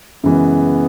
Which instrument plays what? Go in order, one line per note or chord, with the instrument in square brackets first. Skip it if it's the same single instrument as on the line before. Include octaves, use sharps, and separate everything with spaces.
[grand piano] F#2 C#3 E3 G#3 [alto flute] B3